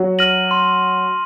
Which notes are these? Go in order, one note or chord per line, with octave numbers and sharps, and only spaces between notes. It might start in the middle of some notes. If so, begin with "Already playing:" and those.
Already playing: F#3 F#4
F6 A#6 D#7 F#7
C6